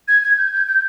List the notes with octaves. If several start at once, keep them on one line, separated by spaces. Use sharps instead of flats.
G#6
G#6
G6
G6
G6